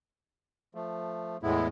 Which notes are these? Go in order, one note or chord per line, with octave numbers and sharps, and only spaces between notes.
F3 A3
E2 A2 G#3 B3 E4